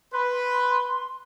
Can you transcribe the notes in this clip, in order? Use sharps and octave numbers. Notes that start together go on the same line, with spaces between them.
B4 C6